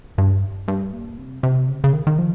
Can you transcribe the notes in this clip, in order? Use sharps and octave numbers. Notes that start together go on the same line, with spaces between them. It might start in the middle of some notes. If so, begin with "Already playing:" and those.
G2
G2
A#2
C3
C3
C#3
C#3
D#3
D#3
F3